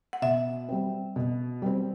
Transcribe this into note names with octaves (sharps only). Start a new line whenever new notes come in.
F#5
B2 E5
G3 C4
B2
G3 C4